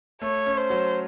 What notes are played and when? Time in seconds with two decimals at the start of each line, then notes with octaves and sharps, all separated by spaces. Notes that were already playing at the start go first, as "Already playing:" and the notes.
0.22 A3 C#5
0.46 C#4
0.57 C5
0.70 F#3